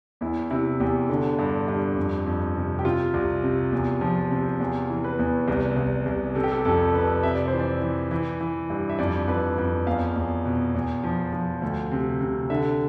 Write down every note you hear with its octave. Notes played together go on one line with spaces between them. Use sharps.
E2 E4
C3 E4
E2 G4
D3
G2
G2
F2
F2
C3
G4
C3 F4
C2
C3
E2
F3
C3
E2
E3
B4
E2
C2
C2
C2
C3 A4
G4
A4
G4
F2 A4
C3 B4
C3 E5
D5
C5
E3
D5
E3
E3
E3
G2
E5
F2 D5
F2 B4
F2
E2 F5
E2
B2
E2
F3
F3
D2
C3
C3
D3 E5